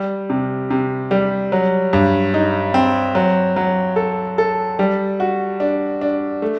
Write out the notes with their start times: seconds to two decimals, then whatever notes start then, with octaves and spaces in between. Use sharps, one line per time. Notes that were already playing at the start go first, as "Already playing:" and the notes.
Already playing: G3
0.30 C3
0.70 C3
1.11 G3
1.52 F#3
1.93 G2
2.34 D#4
2.74 C4
3.15 F#3
3.56 F#3
3.96 A4
4.38 A4
4.79 G3
5.20 F#4
5.60 D4
6.01 D4
6.42 A3